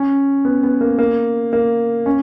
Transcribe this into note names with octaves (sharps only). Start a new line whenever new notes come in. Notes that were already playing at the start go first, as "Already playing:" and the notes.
Already playing: C#4
B3
B3
A#3
A#3
A#3
C#4